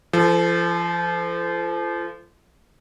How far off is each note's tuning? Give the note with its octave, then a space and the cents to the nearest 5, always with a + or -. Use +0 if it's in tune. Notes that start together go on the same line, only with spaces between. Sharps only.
F3 -30 A4 +0